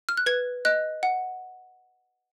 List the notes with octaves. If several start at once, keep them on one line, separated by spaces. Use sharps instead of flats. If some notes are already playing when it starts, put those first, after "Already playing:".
F6
F#6
B4 G#6
D#5 F#6
F#5